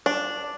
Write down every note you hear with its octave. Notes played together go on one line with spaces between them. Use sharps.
D4